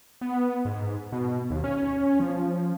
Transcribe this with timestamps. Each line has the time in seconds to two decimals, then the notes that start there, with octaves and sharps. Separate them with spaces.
0.21 B3
0.65 G#2
1.12 B2
1.50 D#2
1.64 C#4
2.20 F3